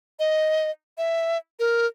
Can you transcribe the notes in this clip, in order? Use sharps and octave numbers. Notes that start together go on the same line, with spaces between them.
D#5
E5
A#4